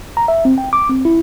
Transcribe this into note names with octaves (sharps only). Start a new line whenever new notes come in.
A#5
E5
C4
G5
D6
C4
E4